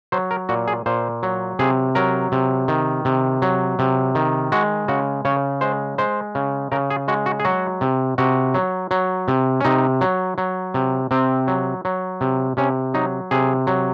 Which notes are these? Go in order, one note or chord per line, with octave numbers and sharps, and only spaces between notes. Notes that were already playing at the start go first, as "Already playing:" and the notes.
F#3 C5
A#4
A#2 F#4
G#4
A#2 C5
F#3
C3 G#4
F#3 A#4
C3
D#3
C3
F#3
C3
D#3
G#3 F#4
C#3 F#4
C#3 C#5
G#3 C5
G#3 C5
C#3
C#3 A#4
G#4
G#3 F#4
F#4
G#4
F#3 F#4
C3
C3 F#4
F#3
F#3
C3
C#4
C3 D#4
F#3
F#3
C3
C3 C4
F#3
F#3
C3
C3 C#4
F#3 D#4
C3 G#4
F#3